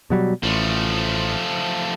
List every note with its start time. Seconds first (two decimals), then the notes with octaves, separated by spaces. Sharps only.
0.10 B2 F#3 G3
0.44 A1 F3 A3